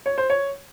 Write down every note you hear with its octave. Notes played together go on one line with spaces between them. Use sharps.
C#5
C5
C#5